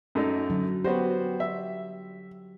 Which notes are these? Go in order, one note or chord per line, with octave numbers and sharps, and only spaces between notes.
F#2 A3 D#4
D3 F#3
B3 F#4 G4 C5 C#5
E5